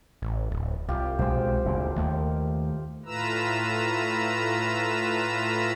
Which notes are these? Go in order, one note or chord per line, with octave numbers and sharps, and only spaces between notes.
A1
D1
C2 F4 G4
B1 G#3 C5 G5
F#1 D2 A#2
D#2 D#3 A3
A2 A3 F4 B4 A#5 E6